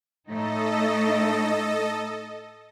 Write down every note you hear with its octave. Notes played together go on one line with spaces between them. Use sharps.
A2 A3 D#4 A4 D#5